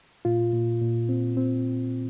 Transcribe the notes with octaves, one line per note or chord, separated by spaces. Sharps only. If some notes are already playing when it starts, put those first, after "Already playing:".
A#2 F4
A#2
A#2
C4
C4